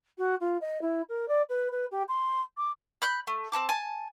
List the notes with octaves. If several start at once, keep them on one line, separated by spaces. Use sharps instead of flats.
F#4
F4
D#5
E4
A#4
D5
B4
B4
G4
C6
D6
B5 F#6 G6
A3
C4 D#4 A5 D6
G#5 A5